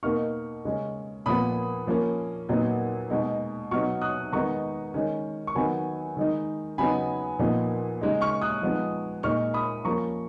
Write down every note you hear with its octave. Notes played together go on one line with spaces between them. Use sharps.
B2 A#3 D#4 C#6 F6
C#3 G#3 C#4
A#2 F3 B3 B5 D#6
F3 A#3 C#4
A#2 F#3 B3 D#4
B2 G#3 D#4
B2 F#3 B3 D#4 C#6 F6
D#6 F#6
D#3 G#3 B3 D#4 A#5 C#6
D#3 G#3 C#4
C#6
D#3 F#3 B3 G#5 B5
D#3 G#3 D#4
C#3 F#3 B3 D#4 G#5 B5
A#2 F3 B3 D#4
C#3 G#3 D#4
C#6 F6
D#6 F#6
F3 G#3 B3 D#4
A#2 G#3 D#4 C#6 F6
B5 D#6
F3 A#3 C#4 A#5 C#6